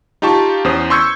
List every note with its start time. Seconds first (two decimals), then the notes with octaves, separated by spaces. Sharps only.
0.22 D#4 F4 G4 A5 C#6
0.65 E2 C#4 C5 D#6
0.90 C6 C#6 E6 G6 G#6 C#7